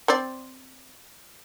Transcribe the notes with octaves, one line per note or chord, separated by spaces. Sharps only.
C4 C5 D5